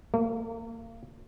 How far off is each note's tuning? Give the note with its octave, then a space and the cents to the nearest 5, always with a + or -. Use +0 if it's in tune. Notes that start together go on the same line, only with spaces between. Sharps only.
A#3 -35